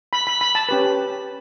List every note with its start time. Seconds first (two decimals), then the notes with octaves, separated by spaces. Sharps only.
0.13 B5
0.27 B5
0.41 B5
0.55 A5
0.69 C#4 G4 B4